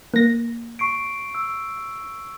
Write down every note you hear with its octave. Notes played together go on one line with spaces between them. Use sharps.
A#3 A#6
C#6 C7 D7
E6